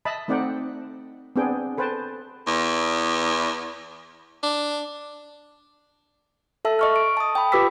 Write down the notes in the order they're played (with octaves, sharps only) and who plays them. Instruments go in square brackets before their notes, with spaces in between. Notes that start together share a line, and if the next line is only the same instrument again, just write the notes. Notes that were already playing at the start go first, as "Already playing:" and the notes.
[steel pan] D#5 E5 A5 B5
A3 C4 D#4 D5 F#5 G5
B3 C4 D4 G#4 G5
A4 B4 C5 G5 A5
[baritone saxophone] E2
D4
[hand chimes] A4 E5 A5 E6
D#5 C#6 F6
D7
A5 D#6
G5 B5
F4 G4 B4 D6 E6 B6